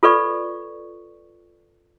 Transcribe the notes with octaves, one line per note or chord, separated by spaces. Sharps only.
F4 A4 B4 D5 C#6